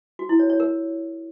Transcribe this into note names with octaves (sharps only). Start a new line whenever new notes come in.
F#4
E4
C#5
C#5
A#4